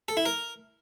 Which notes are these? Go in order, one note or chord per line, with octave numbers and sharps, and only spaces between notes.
A4
E4
A#4